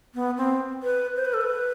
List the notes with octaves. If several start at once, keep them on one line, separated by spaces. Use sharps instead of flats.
B3
C4
B4
C5
B4
A4
B4